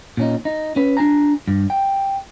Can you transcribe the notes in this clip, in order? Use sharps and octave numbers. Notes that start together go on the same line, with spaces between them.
A#2 C#4 D#4
D#4
C#4 B4
D4 G#5 A#5
G2
G5